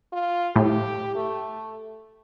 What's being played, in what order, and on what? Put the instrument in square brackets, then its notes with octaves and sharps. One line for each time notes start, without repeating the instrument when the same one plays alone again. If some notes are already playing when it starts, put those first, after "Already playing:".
[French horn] F4
[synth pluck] A2 [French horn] G4
[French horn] A3